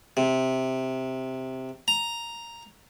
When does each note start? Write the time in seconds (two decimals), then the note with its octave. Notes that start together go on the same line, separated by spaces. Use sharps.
0.17 C3
1.88 A#5